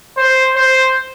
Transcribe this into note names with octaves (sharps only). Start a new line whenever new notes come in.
C5
C5